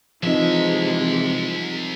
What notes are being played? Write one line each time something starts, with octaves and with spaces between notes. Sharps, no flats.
C2 C3 E3 F3 G#3 D#4 E5